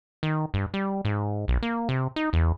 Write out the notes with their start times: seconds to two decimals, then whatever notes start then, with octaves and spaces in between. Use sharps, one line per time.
0.23 D#3
0.54 G2
0.74 G3
1.05 G#2
1.48 B1
1.63 A#3
1.89 C3
2.16 D#4
2.33 E2